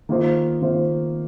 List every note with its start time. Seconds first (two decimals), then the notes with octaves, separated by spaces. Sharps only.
0.09 D#3 A#3 F4 C5
0.62 D#3 A#3 F4 C5